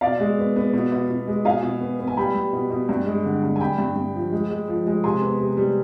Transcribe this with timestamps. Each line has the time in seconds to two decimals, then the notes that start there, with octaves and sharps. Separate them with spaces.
0.01 B2 D5 F5
0.20 G#3
0.38 B3
0.56 B3
0.73 B2
0.92 B2
1.10 B2
1.27 G#3
1.45 B2 F5 G#5
1.63 B2
1.81 B3
1.99 B3
2.07 G#5
2.17 G3 G5 B5
2.35 G3
2.53 B2
2.70 B2
2.89 G2
3.06 G#3
3.25 D3
3.43 G2
3.56 G#5
3.60 G2 G5 B5
3.78 G2
3.96 G2
4.14 F3
4.32 G#3
4.50 G#3
4.68 F3
4.86 G#3
5.04 C3 G#5 C6
5.22 B3
5.40 C3
5.57 G3